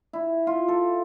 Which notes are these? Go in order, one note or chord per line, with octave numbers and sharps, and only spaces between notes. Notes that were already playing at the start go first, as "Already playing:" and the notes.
E4
F4
A4